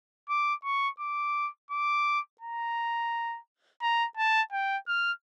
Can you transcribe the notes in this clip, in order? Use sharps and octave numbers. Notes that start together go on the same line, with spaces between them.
D6
C#6
D6
D6
A#5
A#5
A5
G5
F6